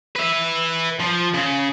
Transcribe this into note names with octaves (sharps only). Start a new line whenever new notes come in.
B4 E5
F3
C#3